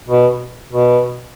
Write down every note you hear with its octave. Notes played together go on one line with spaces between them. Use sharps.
B2
B2